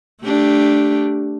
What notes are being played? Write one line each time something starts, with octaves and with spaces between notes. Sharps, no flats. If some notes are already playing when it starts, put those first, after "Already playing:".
A3 D4 G4